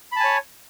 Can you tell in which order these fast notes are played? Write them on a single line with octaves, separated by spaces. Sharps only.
B5 A5 G#5 C#5